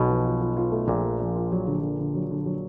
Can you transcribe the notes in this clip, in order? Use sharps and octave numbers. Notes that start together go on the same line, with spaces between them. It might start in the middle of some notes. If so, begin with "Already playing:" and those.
Already playing: B1 B2
F3
F4
F4
F4
A3
A#1 A#2 A3
F3
F3
F4
F#3
D3
D3
D3
F#3
D3
F#3